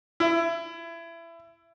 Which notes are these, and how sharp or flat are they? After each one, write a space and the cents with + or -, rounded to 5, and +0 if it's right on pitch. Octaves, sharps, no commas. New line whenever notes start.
E4 +25